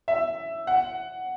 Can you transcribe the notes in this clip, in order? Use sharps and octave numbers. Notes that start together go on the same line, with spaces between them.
E5
F#5